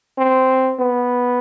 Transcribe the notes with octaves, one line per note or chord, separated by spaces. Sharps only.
C4
B3